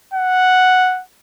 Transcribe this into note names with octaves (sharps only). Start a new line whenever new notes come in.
F#5